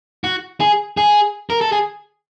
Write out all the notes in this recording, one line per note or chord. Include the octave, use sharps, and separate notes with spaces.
F#4
G#4
G#4
A#4
A4
G#4